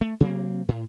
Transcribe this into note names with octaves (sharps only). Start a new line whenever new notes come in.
A3
C3 F#3 A#3 C4
A2